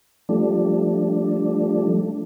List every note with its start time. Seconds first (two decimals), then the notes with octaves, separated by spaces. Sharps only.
0.29 F3 G3 A3 D4